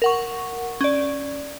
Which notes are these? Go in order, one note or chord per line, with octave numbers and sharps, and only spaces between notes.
A#4 F#5 C#6
C#4 D5